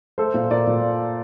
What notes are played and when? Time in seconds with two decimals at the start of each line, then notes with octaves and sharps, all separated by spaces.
0.18 A3 A4 C5
0.34 A#2
0.51 A#2 A#4 D5
0.67 A#2